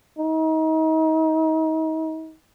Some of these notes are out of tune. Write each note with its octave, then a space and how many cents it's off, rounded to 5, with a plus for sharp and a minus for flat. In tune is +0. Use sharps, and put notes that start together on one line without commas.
D#4 +35